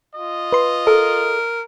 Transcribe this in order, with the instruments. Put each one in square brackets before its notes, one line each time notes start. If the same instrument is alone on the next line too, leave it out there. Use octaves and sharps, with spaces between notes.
[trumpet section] F4 D#5
[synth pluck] B4 C6
[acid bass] A4 [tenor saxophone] A#4